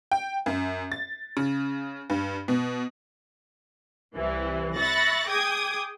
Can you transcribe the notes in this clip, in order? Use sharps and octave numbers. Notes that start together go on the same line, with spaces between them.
G5
F#2
A6
C#3
G2
B2
C2 C3 E3
E5 B5 C#6 F#6 A6 A#6
G#4 G5 D6 D#6 G#6